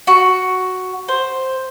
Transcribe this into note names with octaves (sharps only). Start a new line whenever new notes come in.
F#4
C5